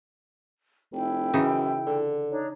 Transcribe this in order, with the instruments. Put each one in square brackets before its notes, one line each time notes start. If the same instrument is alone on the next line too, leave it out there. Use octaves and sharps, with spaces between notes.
[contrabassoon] F1 [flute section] E4 G5
[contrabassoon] F#2 [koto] C#3 E3 D#4
[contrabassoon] D3
[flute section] D4 D#4 C#5